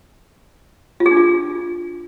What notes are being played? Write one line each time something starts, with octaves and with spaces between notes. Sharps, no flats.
F4
G#4
D4
F4